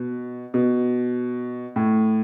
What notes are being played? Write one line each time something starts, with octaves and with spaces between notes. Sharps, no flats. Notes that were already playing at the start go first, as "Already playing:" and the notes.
Already playing: B2
B2
A2